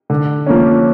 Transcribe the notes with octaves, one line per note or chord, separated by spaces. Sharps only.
D3
F3 A#3 C#4